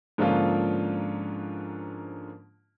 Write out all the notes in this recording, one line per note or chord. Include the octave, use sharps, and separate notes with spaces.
G#2 D3 F3 A#3 C#4 F4